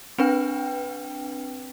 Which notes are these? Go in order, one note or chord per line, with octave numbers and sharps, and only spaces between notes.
C4 D4 B4 G5